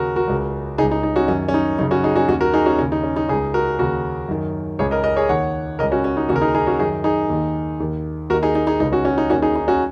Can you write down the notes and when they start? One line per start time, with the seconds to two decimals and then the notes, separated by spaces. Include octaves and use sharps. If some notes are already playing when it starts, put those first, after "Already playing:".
Already playing: D#2 C#3 F#4 A#4
0.16 F#4 A#4
0.28 C#2 C#3
0.78 C#3 D#4 G#4
0.83 C#2
0.91 D#4
1.03 D#4
1.16 C#4 F#4
1.28 F#2 D#3 C#4
1.48 C#4
1.54 D#4
1.79 F#2 C#3 D#4
1.91 C#4 F#4
2.04 D#4 G#4
2.16 C#4 F#4
2.28 D#2 D#3 C#4 F#4
2.41 F#4 A#4
2.54 D#4 G#4
2.66 C#4 F#4
2.78 D#2 C#3 C#4
2.92 D#4
3.04 C#4
3.16 D#4
3.29 C#3 D#4 G#4
3.32 C#2
3.54 F#4 A#4
3.79 D#2 C#3 F#4 A#4
4.28 F#2 D#3
4.79 C#2 C#3 G#4 C#5
4.91 A#4 D#5
5.04 A#4 D#5
5.16 G#4 C#5
5.29 D#2 D#3 C#5 F#5
5.79 C#3 A#4 D#5
5.83 C#2
5.92 C#4 F#4
6.04 C#4
6.17 D#4
6.29 D#2 C#4 F#4
6.33 C#3 A#4
6.41 D#4 G#4
6.54 D#4 G#4
6.67 C#4 F#4
6.79 F#2 D#3 D#4 G#4
7.04 D#4 G#4
7.30 D#2 D#3
7.80 D#2 D#3
8.30 D#2 F#4 A#4
8.33 D#3
8.42 D#4 G#4
8.55 D#4
8.67 D#4 G#4
8.80 C#2 C#3 D#4
8.92 C#4 F#4
9.05 C#4 F#4
9.18 D#4
9.30 D#2 D#3 C#4 F#4
9.42 D#4 G#4
9.55 D#4
9.68 C#4 F#4